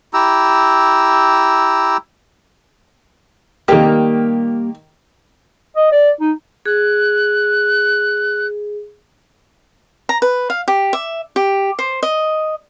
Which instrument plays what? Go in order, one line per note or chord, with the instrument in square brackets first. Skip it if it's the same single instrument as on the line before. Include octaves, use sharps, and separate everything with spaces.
[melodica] E4 G4 A#5 E6
[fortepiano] D#3 G4 [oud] G3 A#3
[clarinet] D#5
D5
D#4
[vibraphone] G#4 [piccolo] F#6
[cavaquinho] A#5
B4
F5
G4
E5
G4
C5
D#5